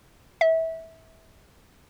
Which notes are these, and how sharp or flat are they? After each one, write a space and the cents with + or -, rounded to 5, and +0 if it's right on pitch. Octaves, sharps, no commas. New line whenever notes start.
E5 -20